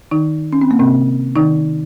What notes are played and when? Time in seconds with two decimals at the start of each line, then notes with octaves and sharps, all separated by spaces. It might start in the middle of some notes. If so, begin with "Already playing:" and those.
0.11 D#3 D#4
0.53 C#4
0.61 C4
0.71 A#3
0.79 C3 C4
1.36 D#3 D#4